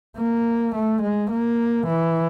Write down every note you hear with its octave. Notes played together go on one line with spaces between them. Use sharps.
A#3
A3
G#3
A#3
E3